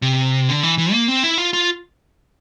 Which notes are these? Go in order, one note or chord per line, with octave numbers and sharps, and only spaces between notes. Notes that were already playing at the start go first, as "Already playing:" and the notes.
C3
D3
E3
E3
A#3
C4
E4
F4
F4